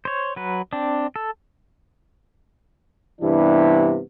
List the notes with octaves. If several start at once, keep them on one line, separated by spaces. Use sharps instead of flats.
C5 C#5
F#3 B4
C4 D4
A4
G2 C3 E3 B3 D4 E4